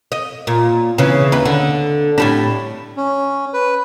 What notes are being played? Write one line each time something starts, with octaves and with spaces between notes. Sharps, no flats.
D#5
A#2
C#3 E3
D#2 B4
D3
A2 G3 D4
C#4
B4